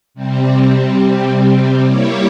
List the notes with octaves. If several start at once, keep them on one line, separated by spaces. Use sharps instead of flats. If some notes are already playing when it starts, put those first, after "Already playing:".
C3 G3 C4
G3 A#3 E4 G4 C#5